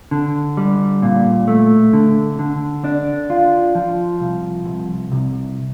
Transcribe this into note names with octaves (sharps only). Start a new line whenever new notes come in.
D3
G3
A#2
A3
D3
D3
D4
F4
F3
C2
C2
C2